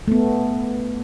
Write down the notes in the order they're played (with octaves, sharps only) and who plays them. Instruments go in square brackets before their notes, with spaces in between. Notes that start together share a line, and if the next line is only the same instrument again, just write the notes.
[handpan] A3 B3